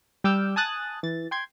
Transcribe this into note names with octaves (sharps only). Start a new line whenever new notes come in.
G3 G5 D6 E6 F6 G6
G#5 A5 D#6 F#6 A6
E3 A6
G5 C6 G#6